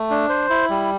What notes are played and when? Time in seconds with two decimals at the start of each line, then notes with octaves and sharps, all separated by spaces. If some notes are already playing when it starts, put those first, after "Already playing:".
Already playing: A3
0.10 D4
0.29 C5
0.50 E4
0.70 G3